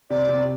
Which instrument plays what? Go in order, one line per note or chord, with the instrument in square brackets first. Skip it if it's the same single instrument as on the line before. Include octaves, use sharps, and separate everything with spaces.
[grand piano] C3 [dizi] D5
[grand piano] C3